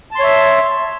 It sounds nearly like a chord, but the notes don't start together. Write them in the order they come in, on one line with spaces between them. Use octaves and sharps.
A5 C6 C#5 E5